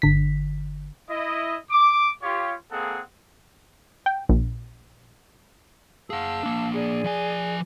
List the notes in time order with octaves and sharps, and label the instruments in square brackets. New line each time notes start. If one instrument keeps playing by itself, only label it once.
[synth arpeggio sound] G1 D3 B6
[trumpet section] E4 D#5
D6
F4 G4 C#5
G#3 A#3 C4 G#4 A4 F#5
[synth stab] G5
A#1
[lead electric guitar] G#4 F#5 [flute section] F5 A5 E6
[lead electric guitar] A#3 D4
[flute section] G#4 D5
[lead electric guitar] F3 G#5